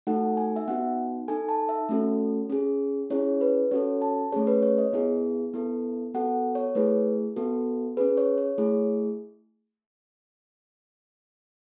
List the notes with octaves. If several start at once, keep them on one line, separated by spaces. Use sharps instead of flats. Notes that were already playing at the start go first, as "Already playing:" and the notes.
A3 D#4 F#4 A4 F#5
G#5
E5
B3 D#4 F#4 F#5
D#4 A4 G#5
A5
E5
A3 C#4 F#4 A4
C#4 G#4
C#4 E4 G#4 C#5
B4
C#4 F#4 A4 C#5
A5
A3 C#4 G#4 C#5
B4
C#5
D#5
B3 E4 G#4
B3 E4 A4
B3 F#4 A4 F#5
C#5
A3 E4 G#4 B4
B3 F#4 A4
C#4 G#4 B4
C#5
C#5
A3 E4 G#4